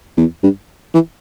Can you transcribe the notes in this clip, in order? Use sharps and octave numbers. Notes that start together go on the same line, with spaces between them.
E2
G2
E3